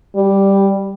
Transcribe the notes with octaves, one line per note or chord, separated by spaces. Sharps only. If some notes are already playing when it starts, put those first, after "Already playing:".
G3